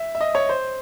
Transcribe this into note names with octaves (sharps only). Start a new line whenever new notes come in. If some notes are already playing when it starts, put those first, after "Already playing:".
Already playing: E5
E5
D#5
C#5
C5